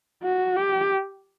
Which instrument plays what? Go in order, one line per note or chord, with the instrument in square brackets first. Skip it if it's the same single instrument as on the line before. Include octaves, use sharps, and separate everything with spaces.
[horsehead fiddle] F#4
G4